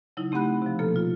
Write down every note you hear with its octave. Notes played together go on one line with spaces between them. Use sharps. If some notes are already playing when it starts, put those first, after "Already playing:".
C#3 F#3 D#4 E4
A3 C4 G4 F#5 B5 F#6
C3 F3
B2 F3 A#3 A4 F6
F4